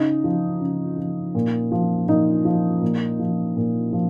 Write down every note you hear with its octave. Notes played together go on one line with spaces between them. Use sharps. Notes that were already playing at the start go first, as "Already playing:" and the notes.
Already playing: C#3 D#4
F3
C#3
F3
A#2
F3
A#2 D#4
F3
A#2
F3
A#2
F3